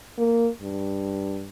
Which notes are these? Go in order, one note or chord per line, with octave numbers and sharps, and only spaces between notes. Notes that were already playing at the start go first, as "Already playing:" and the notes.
A#3
G2